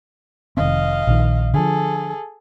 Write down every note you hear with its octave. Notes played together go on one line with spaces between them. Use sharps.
F1 D#3 C4 D#5 F5
A#1 D#3
D3 F3 G#4 A4